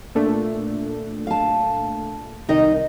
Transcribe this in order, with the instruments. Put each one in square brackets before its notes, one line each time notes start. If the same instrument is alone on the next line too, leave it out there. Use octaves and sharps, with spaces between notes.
[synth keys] A#2 A3 D4
[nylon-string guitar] F5 A5
[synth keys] C2 [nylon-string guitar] D#3 D#4 D#5